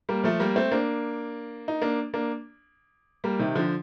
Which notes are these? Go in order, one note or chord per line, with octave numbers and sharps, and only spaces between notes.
G3 A#3
F3 A3
G3 A#3
A3 C4
A#3 D4
D#4
A#3 D4
A#3 D4
G3 A#3
C3 D#3
D3 F3